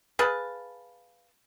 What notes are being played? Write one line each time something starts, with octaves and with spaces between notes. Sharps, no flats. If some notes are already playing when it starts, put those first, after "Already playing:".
G#4 B4 F5 A5